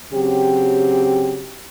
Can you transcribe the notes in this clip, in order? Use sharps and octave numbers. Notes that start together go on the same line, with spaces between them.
C#3 F#3 C4 G4